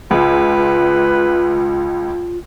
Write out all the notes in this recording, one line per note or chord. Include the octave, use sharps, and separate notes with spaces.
C#2 F4 B4